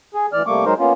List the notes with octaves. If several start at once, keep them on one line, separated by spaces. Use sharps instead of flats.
G#4
D2 E3 D5 F6
C3 G3 A3 A#3 C#6 D6
F#3 G#3 D#4 A#4 C5
A#3 B3 C#4 F4